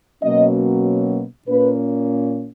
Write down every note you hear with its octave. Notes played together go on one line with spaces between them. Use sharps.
B2 F#3 A#3 C#4 D#5
A#2 A#3 C#4 B4